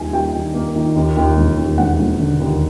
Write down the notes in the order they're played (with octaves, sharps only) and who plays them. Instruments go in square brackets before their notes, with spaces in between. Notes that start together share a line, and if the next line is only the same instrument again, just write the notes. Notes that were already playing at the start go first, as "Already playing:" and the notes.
Already playing: [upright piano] D#2 D#3 G3 G#5
G3 G5
D#3
A#3
D#3
D#2
D#2
E1
D#2
E1 F#5
E1
D3
D#2